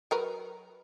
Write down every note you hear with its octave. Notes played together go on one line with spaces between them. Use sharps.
F#3 A#4 B4